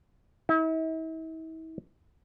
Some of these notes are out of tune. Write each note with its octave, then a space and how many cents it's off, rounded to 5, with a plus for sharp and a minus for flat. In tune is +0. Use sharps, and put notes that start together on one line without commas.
E4 -45